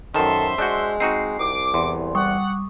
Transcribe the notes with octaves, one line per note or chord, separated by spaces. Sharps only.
F#2 D#3 A4 C5 E5 B5 C6 E7
G#3 D4 F#4 E6 F#6 G6
C4 D#4 F#4 C7
C2 D6
E2 C6
G3 F#5 C#6 D#6